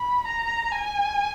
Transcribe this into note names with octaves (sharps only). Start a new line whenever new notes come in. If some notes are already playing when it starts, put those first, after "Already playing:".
Already playing: B5
A#5
G#5